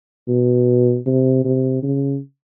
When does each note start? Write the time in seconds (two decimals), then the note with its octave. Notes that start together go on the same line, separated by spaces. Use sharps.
0.28 B2
1.06 C3
1.45 C3
1.83 C#3